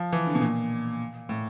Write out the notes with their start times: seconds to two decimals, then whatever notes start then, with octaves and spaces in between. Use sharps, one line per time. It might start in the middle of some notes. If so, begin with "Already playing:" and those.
Already playing: F3
0.12 E3
0.27 D3
0.35 B2
0.41 A#2
1.29 A2